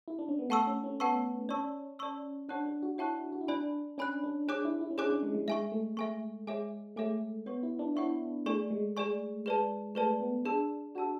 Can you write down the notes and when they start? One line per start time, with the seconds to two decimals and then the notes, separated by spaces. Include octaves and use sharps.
0.08 E4
0.19 D4
0.29 C#4
0.39 B3
0.49 A3 F#5 A5 C#6 E6
0.67 C#4
0.84 C#4
1.00 B3 F#5 A5 C#6 E6
1.49 C#4 D5 A5 C#6 E6
1.99 D5 A5 C#6 E6
2.49 D4 C#5 F#5 A5 C#6 F#6
2.66 D4
2.83 F#4
2.98 E4 C#5 F#5 A5 C#6 F#6
3.32 F#4
3.41 E4
3.48 D4 D5 G#5 B5 F#6
3.98 C#4 D5 G#5 B5 F#6
4.24 D4
4.48 D4 G#4 C#5 G#5 D6 F#6
4.65 E4
4.81 E4
4.91 C#4
4.98 D4 G#4 C#5 G#5 D6 F#6
5.10 C#4
5.23 G#3
5.35 G#3
5.48 G#3 E5 G#5 C#6
5.72 A3
5.97 A3 E5 G#5 C#6
6.47 G#3 G#4 C#5 E5 G#5 D6
6.96 A3 G#4 C#5 E5 G#5 D6
7.46 B3 C#5 F#5 C#6
7.63 E4
7.79 D4
7.96 E4 C#5 F#5 C#6
8.46 A3 G#4 D5 G#5 C#6
8.70 G#3
8.97 G#4 D5 G#5 C#6
9.46 G#4 B4 D5 A5
9.95 A3 G#4 B4 D5 A5
10.20 B3
10.45 D4 G#4 D5 A5 E6
10.95 F#4 G#4 D5 A5 E6